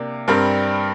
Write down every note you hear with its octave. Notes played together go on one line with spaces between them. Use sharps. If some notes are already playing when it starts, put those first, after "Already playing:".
Already playing: C3 A#3 D4
G2 G3 C4 A#4